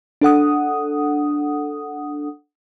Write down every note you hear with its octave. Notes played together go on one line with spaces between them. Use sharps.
D4 A4 F#5 D#6